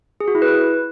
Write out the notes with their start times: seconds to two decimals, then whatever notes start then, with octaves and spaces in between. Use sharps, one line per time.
0.20 G#4
0.28 F#4
0.35 E4
0.42 B4